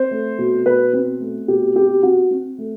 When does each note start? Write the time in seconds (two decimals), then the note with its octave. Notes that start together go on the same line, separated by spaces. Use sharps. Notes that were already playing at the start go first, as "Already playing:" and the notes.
Already playing: C4 C5
0.11 A3
0.38 B2
0.66 B2 B4
0.93 C4
1.20 A3
1.48 B2 G4
1.76 C4 G4
2.03 C4 F#4
2.31 C4
2.58 A3